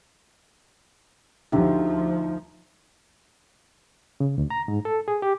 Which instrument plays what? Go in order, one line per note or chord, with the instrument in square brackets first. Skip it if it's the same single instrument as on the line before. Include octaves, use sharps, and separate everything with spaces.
[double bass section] D2 F3 [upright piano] D3 G4 [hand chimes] D#4 E5 A#5
[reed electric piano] C#3
D2
A#5
G#2
A4
G#4
G4